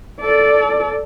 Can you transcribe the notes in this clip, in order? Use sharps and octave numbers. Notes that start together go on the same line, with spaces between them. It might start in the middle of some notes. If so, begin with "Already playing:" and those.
A4 D5